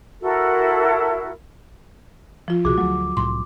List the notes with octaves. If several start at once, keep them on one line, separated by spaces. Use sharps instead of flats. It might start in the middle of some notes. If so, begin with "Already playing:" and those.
E4 F#4 A4 A#4
F3 F4
C2 B2 F#4 G#4 D6
D2 F#3 A3
C2 A2 C6